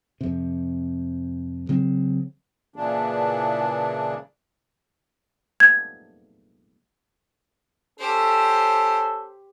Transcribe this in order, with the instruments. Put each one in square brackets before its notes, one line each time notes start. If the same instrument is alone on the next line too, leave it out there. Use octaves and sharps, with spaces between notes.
[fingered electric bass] F2 C3
C#3 F#3 C4
[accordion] A#2 C#3 E3 D4
[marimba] G#6
[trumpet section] C#4 A4 [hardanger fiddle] G4 C5